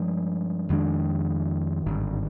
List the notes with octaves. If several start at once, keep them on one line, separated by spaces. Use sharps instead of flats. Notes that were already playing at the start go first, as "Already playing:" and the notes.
Already playing: G2 F3 G#3
F2 D#3 G#3 D4
G#1 G2 D3